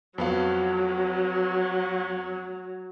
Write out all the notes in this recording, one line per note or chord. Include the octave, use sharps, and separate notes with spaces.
F2 F#3 B3 F5